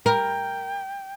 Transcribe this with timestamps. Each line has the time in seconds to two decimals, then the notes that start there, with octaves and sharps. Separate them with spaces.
0.06 A#4 G5